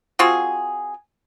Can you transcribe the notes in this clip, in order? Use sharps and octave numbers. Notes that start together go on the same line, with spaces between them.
C4 F4 F#4 G#4